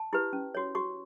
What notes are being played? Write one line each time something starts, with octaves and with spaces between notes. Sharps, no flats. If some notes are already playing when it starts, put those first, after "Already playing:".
Already playing: A5
E4 G4 B4
C#4
F#4 C#5
F#4 C#6